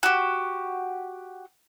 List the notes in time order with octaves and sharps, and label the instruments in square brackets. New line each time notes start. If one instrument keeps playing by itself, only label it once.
[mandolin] F#4 G4